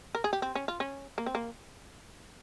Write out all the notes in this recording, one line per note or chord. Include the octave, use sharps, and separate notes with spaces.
A#4
G#4
G4
C4
C#4
F4
C#4
A#3
C4
A#3